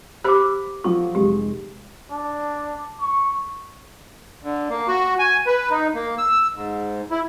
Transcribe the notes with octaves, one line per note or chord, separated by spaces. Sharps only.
G4 C5 B5 D6
F3 F#3 F4 A4 C#6
F1 G#3 G4
D4
C#6
D3
A#3
F#4
G#5
B4
D#4
A#3
E6
G#2
E4